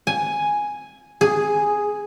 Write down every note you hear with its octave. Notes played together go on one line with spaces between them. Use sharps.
G#5
G#4